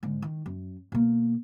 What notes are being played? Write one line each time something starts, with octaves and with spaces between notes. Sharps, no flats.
G#2 D3
D#3
F#2
B2 A#3